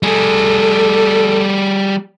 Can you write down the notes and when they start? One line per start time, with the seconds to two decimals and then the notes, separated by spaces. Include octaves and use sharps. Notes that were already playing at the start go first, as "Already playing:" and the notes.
0.03 G3 G#4 A4